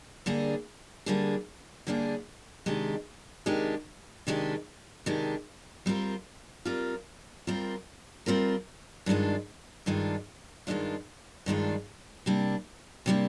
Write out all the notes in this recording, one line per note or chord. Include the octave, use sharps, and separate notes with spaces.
D3 G3 A#3 D4 G#4
D3 G3 A#3 D4 G#4
D3 G3 A#3 D4 G#4
C3 D#3 G#3 D4 G4
C3 D#3 G#3 D4 G4
C3 D#3 G#3 D4 G4
C3 D#3 G#3 D4 G4
G3 C4 F4 A#4
G3 C4 F4 A#4
G3 C4 F4 A#4
G3 C4 F4 A#4
G2 D#3 G#3 D4 F4
G2 D#3 G#3 D4 F4
G2 D#3 G#3 D4 F4
G2 D#3 G#3 D4 F4
C3 G3 A#3 D4
C3 G3 A#3 D4